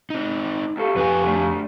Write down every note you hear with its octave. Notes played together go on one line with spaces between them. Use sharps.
C4 D#4
C#2 G4 A4 F5 C#6
F2 C3 F#4 B4 G#5
D3 A3